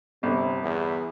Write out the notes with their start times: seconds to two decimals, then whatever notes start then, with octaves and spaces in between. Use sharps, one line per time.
0.23 G1 C3
0.63 E2